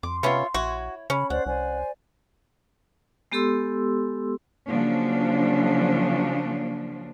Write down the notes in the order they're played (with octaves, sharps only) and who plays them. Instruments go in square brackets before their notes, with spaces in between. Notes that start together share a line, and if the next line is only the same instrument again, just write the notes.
[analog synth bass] F2 [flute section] C6 [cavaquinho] D6
[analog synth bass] C3 [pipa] B3 C#4 [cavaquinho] F4 C#5 E5
[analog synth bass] A#1 [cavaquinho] E4 C#5 [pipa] F#4
[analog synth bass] C#3 [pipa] C#4 [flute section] B5
[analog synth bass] D2 [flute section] C5 D5 [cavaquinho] F#5
[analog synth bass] C2 [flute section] C5 D5 G#5
[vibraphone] G#3 B3 G4 A4 C6 E6
[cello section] C#3 F3 F#3 A#3 D4